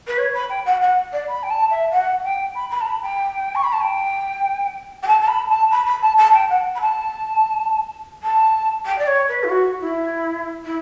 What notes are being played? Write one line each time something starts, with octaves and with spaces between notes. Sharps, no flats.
B4
C#5
B5
G5
F#5
F#5
D5
B5
G5
A5
E5
F#5
G5
B5
B5
A5
B5
G5
C#6
B5
A5
G5
G5
A5
A5
B5
A5
B5
B5
A5
A5
G5
F#5
B5
A5
A5
G5
D5
C#5
B4
E4
F#4
E4
E4